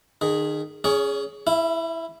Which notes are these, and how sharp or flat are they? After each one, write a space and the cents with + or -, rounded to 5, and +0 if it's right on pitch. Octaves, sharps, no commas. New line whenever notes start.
D#3 -35 G#4 +0
C#4 +0 G#4 +0 C#5 +40
E4 +0 E5 +40